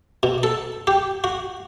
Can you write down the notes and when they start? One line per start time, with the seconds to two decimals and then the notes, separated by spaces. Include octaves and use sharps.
0.23 B2
0.43 A4
0.87 G4
1.24 F#4